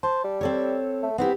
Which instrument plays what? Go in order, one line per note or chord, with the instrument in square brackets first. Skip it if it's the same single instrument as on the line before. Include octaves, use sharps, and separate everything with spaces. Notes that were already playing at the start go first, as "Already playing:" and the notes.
[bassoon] C5 [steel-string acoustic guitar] A5
[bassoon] G3
[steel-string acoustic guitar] C4 A4 C#5
[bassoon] A3
[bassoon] B3 [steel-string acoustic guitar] C4 E4 G4